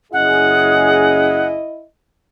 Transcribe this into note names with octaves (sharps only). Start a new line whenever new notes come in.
F#1 C#4 E4 G#4 D#5 F#5